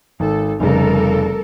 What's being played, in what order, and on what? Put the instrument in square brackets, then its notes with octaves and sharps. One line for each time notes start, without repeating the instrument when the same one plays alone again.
[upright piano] G#1 [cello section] A4
[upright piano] F1 C#3 [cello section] G3 A4 A#4